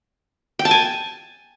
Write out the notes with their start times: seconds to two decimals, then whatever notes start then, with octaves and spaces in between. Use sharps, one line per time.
0.59 G5
0.65 A5
0.71 G#5